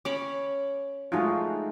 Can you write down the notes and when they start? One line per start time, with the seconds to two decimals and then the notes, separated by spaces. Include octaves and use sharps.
0.05 C#4 C#5 B5 D6
1.12 G#3 A3 D#4 F4 F#4